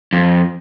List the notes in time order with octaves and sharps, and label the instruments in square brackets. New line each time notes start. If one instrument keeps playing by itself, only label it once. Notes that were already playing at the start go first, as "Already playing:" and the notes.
[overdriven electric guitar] F2